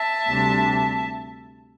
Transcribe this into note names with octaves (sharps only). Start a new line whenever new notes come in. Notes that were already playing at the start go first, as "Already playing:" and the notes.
Already playing: E5 A5
D2 C3 G3 D4